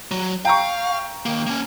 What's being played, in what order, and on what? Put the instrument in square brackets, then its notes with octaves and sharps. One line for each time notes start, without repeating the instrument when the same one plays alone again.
[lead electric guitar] F#3
[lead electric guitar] F5 [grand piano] G5 A#5 C#6
[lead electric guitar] D#3 A#3
A#3 C#4